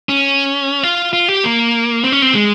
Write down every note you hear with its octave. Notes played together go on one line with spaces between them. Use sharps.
C#4
F4
F4
G4
A#3
C4
C#4
C4
G#3